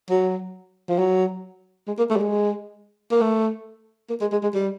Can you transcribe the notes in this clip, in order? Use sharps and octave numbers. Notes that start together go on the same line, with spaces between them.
F#3
F3
F#3
G#3
A#3
A3
G3
G#3
A#3
A3
A#3
G#3
G#3
G#3
G3